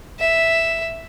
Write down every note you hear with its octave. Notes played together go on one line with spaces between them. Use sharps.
E5